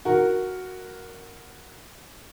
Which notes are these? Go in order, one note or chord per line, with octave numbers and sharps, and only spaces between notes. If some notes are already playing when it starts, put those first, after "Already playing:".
F#4 A#4